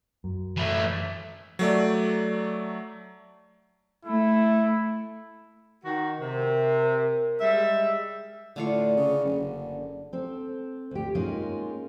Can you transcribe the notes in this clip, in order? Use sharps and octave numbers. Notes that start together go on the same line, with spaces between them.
F#2
E3 A3
F#3 A3 D5
A3 E4
D#3 F#4
C3 A#4
G3 G#3 E5
A2 D3 F4 C#6
C#3
F#1
C4 A4
D2 G4
G#3 A#3 C#4 D#4 F4 G#4